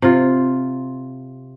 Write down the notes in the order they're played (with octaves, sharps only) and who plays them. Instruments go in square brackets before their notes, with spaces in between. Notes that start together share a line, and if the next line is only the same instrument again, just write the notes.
[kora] C3 F4